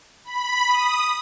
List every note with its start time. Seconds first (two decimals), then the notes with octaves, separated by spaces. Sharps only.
0.25 B5
0.67 D#6